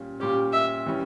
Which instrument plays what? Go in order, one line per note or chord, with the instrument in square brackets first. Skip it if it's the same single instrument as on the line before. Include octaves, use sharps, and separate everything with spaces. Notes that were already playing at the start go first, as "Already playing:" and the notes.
Already playing: [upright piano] A#2 G3 C#4
[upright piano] A#2 G3 C#4 [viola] G4
[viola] E5
[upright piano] E3 G3 C#4